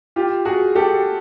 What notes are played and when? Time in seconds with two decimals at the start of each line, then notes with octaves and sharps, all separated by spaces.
0.16 F4 G4
0.45 F#4 G#4
0.75 G4 A4